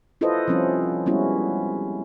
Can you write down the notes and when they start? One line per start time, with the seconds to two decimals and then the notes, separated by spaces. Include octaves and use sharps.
0.21 E4 F4 A4 B4 C5 D#5
0.48 F3 G3 C4 C#4 F4
1.06 G3 G#3 B3 C#4 E4 F#4